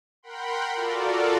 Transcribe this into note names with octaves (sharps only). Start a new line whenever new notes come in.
A#4 F#5 G5 B5 C6
F4 F#4 A4 A#4 D5